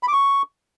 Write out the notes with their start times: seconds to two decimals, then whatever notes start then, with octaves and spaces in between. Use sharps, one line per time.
0.03 B5
0.08 D6
0.13 C#6